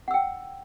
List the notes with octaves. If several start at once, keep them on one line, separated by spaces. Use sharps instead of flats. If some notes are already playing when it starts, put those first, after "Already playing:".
F#5 G5 E6